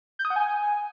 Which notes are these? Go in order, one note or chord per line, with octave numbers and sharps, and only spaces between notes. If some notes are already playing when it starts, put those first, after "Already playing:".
G6
D#6
F#5
G#5